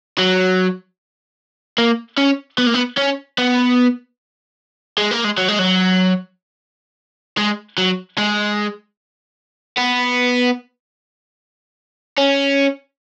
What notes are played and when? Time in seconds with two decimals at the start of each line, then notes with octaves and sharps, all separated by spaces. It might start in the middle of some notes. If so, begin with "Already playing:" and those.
0.18 F#3
1.78 A#3
2.18 C#4
2.58 B3
2.67 A#3
2.74 B3
2.98 C#4
3.38 B3
4.98 G#3
5.11 A#3
5.24 G#3
5.38 F#3
5.49 G#3
5.59 F#3
7.37 G#3
7.78 F#3
8.18 G#3
9.78 B3
12.18 C#4